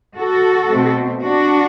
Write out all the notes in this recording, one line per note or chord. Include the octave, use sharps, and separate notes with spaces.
F#4 A4
B2 A3 C4
D4 F#4